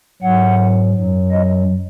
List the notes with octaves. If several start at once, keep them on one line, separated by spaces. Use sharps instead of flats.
G#2 F#3 F#5
F#2 F#3
D#5